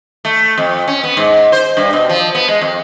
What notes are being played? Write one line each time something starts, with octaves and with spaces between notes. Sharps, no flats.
A3
F2
C#4
B3
G#2
C5
G2
B2
F3
B3
G#3
F2